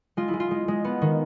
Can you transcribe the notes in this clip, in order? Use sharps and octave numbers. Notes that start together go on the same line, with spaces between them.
G#3 F4
E4
G#3
F4
G#3
G#3
B3
D#3